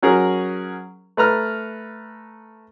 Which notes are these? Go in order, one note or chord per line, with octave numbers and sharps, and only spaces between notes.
F#3 C#4 G#4 A#4
A3 B4 A#5 F6